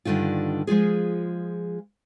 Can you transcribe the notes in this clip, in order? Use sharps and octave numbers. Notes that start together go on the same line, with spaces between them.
G2 A#2 D3 D#3 F4
F3 G#3 F4 G#4